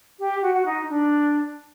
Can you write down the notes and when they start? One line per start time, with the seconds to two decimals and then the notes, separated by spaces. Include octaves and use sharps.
0.19 G4
0.42 F#4
0.54 F#4
0.65 D#4
0.89 D4